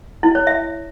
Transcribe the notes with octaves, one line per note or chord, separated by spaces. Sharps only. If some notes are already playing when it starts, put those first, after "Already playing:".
E4
C#5
E5